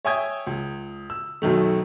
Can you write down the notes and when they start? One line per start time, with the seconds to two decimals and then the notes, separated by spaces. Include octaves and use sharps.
0.05 C#5 E5 G5 G#5 D#6 G#6
0.47 C#2
1.10 E6
1.42 F#2 B2 D#3 A3